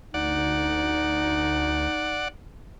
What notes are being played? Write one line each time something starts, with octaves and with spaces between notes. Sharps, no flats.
D2 D#4 D5 F#5